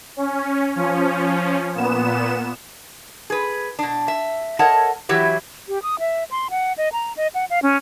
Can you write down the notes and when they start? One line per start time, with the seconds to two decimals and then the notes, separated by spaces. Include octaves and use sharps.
0.17 C#4
0.76 F3 C#4
1.75 A#2 B3 E7
3.30 G#4 B4
3.79 B2 D4
4.08 E5
4.59 A4 A#4 C#5 D#5 F#5 A5
5.09 E3 F#3 E4 G4 E5
5.68 G4
5.83 D#6
5.99 E5
6.31 C6
6.50 F#5
6.78 D#5
6.92 A#5
7.17 D#5
7.35 F#5
7.50 F5
7.63 C#4